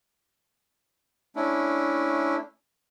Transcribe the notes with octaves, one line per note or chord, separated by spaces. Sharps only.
A3 C#4 D4 E4